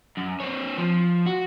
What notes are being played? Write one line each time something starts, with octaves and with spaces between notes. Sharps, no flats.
F#2
C4 C#5
F3
F#4